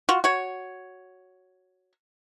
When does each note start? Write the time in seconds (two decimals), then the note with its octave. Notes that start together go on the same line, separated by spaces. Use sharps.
0.09 F4 F#4
0.24 F#4 C#5